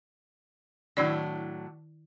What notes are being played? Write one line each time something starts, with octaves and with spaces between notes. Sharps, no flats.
A2 D#3 F#3 D4 E4 D5